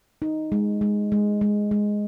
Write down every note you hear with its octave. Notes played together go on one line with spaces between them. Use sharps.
D#4
G#3
G#3
G#3
G#3
G#3